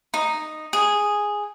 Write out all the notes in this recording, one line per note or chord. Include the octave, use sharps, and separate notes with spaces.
D#4
G#4